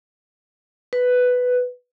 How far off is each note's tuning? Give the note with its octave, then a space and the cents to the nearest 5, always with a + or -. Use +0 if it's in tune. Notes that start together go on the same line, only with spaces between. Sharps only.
B4 +5